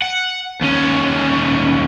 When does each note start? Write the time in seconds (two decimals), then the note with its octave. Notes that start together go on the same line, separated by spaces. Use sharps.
0.02 F#5
0.61 D#2 C#4